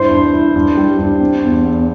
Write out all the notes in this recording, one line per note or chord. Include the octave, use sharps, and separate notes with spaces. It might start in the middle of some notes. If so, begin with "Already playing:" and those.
Already playing: G2 E4 C5 C6
G2
E4
G2
G3
G2
C4
E2
E2